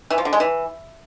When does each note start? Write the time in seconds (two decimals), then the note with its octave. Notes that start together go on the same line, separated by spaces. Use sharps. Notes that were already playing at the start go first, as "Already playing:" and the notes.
0.10 E3
0.18 F3
0.25 D3
0.33 G#3
0.40 E3